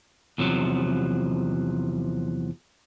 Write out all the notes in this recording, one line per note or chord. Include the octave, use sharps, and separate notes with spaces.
E2 C3 F3 F#3